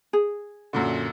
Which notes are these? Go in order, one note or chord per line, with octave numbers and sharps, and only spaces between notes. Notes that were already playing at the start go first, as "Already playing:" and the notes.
G#4
F#2 A#2 D3